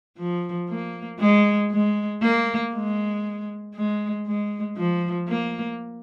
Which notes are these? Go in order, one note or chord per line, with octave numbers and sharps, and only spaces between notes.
F3
A#3
G#3
G#3
A#3
G#3
G#3
G#3
F3
A#3